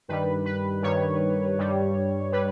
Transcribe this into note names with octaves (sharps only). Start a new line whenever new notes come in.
G2 D#3 G3 B4
B4
G2 D#3 G3 C#5
G2 G3
G3 B4